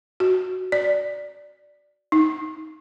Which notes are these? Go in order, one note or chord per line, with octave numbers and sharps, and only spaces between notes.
F#4
D5
D#4